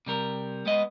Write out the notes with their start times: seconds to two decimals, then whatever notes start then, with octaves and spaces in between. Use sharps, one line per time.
0.06 C3 G3 A#4
0.66 G#3 B3 D#5